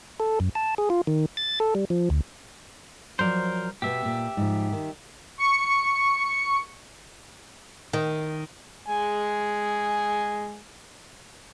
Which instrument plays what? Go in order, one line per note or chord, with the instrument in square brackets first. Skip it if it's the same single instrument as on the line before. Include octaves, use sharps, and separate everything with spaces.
[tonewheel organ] A4
F#2
A5
G#4
F4
D#3
A6
A4
G3
F3
D2
[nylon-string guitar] F3 F#3 D5 [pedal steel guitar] A#4 C5
[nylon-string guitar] B2 B3 [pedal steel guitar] G4 E5
[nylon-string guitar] A#2
G#2 F3
D#3
[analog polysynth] C#6 C#7
[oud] D#3
[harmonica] G#3 G#5